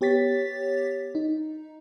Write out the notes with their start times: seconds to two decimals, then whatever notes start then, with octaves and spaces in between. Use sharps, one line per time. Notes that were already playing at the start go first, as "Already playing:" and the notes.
0.01 B3 G4 C#5 A6 B6
1.15 D#4